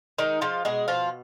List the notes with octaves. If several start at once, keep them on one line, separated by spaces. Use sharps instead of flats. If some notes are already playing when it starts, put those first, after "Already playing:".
D#3 G#3 D#4
F3 G#3 F4
B2 G#3 G#4
B2 F3 F4